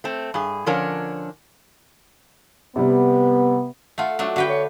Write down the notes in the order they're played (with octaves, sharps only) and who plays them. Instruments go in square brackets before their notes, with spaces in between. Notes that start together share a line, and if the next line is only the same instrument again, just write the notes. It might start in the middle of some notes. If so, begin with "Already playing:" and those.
[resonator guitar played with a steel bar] A3 C4
G2 G#4
D3 F3 C#4 D4 A#4 C#5
[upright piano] C3 G3 [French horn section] B3
[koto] A3 F4 [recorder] F#5
[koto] F#3 A3 D4
[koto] D3 B4 G5 [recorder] F#4
[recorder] C#5